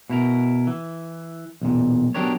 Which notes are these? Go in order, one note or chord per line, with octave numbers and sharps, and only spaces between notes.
B2 E4 A#4
E3
B1 E2 A#2
F#3 B3 D4 G4 A#4 C#5